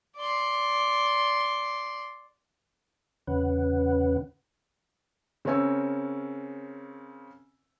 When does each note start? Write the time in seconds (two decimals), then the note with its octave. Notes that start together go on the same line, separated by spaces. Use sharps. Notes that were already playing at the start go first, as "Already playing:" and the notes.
0.17 D5 C6
3.27 E2 C#3 C#4 B4 F#5
5.45 C#3 C4 A#4 C#5 G#5 E6